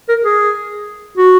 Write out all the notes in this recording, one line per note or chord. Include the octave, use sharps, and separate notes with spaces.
A#4
G#4
F#4